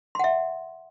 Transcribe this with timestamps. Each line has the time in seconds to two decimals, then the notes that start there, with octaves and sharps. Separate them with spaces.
0.15 C6
0.20 F#5
0.24 E5